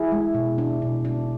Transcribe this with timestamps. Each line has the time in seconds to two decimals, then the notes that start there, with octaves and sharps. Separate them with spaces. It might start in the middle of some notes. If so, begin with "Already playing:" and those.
Already playing: E4 G#4
0.12 G#3
0.34 B2
0.58 D4
0.82 B2
1.05 D4